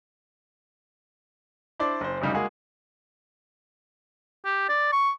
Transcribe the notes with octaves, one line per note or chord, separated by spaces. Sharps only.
D4 E4 C5 D5
F#1 C5
F1 D2 C#3 G3 D#4
G#3 A#3 F#4 G#4
G4
D5
C#6